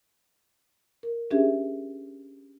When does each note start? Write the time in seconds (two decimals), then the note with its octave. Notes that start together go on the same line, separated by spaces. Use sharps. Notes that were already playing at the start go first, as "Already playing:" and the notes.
1.03 A#4
1.31 C#4 D4 G4 G#4 E5